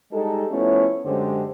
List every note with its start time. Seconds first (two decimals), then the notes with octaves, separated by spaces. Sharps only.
0.11 G3 G#3 D#4 G4 A4
0.51 F3 A3 B3 C#4 E4 C#5
1.05 F#2 D3 G#3 C#4 G4 C5